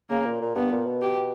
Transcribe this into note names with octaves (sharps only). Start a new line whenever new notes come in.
C#3 A#3
A#2
A#2
G2 B3
A#2
B2
G4